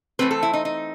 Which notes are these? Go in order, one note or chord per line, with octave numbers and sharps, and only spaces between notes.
E3 A3 C4 B4
A4
E4
D#4
D#4